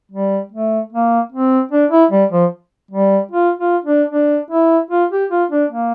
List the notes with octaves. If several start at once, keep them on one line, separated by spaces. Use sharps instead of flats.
G3
A3
A#3
C4
D4
E4
G3
F3
G3
F4
F4
D4
D4
E4
F4
G4
F4
D4
A#3